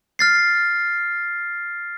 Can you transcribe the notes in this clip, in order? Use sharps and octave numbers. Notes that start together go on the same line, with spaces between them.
F6 A6 C7